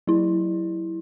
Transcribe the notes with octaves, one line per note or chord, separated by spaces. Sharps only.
F#3 E4